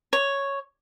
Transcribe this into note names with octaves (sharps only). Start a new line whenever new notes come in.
C#5